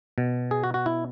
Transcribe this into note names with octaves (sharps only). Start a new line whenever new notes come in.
B2
G#4
F#4
F#4
E4